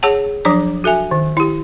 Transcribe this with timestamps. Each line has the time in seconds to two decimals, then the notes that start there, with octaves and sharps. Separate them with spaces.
0.03 G#4 C#5 F#5 A5
0.45 F3 F#3 D4 D6
0.84 F#4 A4 E5 G#5
1.11 D#3
1.37 E4 G4